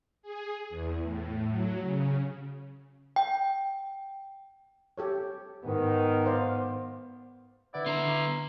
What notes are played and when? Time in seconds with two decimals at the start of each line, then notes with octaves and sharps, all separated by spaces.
0.23 G#4
0.69 E2
1.02 A2
1.50 F#3
1.82 C#3
3.16 G5
4.98 G4 A4 C#5
5.64 G#2 D#3 B3
6.26 C5 D5 F5
7.74 D3 E4 B4 D5 F#5
7.86 D3 D#3 B3 A#5 C6